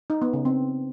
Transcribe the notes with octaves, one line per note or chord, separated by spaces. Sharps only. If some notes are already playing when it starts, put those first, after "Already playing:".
D#4
B3
C#3
C4